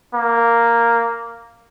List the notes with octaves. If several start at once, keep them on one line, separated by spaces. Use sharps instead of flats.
A#3